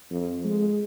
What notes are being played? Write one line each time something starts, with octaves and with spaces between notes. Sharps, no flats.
F2
G#3